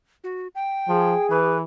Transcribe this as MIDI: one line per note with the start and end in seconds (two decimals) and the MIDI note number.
0.24 0.48 66
0.55 1.29 79
0.88 1.15 53
0.88 1.57 68
1.30 1.64 52
1.30 1.57 71